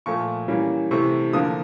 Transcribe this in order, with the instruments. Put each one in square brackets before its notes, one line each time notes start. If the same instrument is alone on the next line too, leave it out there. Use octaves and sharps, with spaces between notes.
[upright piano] A#2 F3 A3 C#6
E3 G3 A#3 C#4
C3 E3 A3 C#6
D3 F3 A#3 D#6